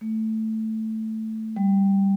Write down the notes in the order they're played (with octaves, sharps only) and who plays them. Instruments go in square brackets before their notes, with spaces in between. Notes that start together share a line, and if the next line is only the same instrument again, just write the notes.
[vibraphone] A3
G3